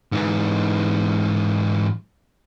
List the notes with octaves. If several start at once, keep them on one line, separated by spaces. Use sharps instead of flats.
G#2 E3